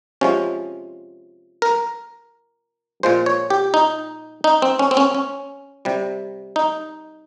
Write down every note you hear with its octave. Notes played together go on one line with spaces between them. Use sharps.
C3 F3 G#3 C#4
A#4
A#2 F3 G#3 C5
C#5
G4
D#4
D#4
C4
C#4
C4
C#4
C#4
C3 G3
D#4